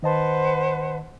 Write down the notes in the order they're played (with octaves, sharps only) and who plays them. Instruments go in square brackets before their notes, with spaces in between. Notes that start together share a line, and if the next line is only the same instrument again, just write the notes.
[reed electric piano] D#3 D#5 A5 [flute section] B4 C5 F#5